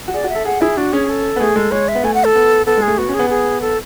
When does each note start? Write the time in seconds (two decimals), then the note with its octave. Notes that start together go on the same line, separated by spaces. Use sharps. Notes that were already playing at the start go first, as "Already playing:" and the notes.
0.08 F#4
0.14 G#4 D5
0.24 F#4
0.29 E5
0.35 A4
0.45 G#4 F#5
0.61 E4 G#4
0.77 D4 F#4
0.93 C#4 G#4
1.09 A4
1.36 B3
1.40 A3 G#4
1.56 G#3 A4
1.71 G#3 C#5
1.88 E5
1.95 B3
2.04 A3 G#5
2.14 F#5
2.24 A4
2.35 B3
2.66 B3 A4
2.77 G#3
2.82 G#4
2.88 A3
2.98 B3 F#4
3.09 C#4
3.14 G#4
3.19 B3
3.30 G#4
3.61 A4